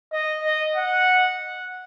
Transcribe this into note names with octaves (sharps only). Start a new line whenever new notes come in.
D#5
D#5
F#5